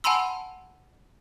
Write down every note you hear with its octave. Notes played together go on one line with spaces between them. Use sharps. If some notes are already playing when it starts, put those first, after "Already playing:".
F#5 G#5 A5 B5 C6 E6